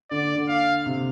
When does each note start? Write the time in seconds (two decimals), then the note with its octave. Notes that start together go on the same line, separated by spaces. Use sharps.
0.11 D3 D5
0.35 D3
0.48 F5
0.86 C3